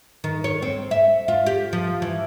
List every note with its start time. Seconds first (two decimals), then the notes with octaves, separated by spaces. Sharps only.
0.24 D#3
0.44 C#5
0.62 C4
0.91 E5
1.28 F4
1.46 G4
1.73 F3
2.02 E3